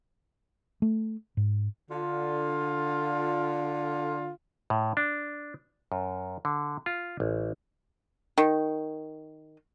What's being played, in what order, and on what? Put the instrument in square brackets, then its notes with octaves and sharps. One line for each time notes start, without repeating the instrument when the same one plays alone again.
[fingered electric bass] A3
G#2
[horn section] D3 F4
[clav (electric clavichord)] A2
D4
F#2
D3
F4
A1
[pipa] D#3